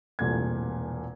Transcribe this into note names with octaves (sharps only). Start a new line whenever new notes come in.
E1 C2 A#2 A3 G#6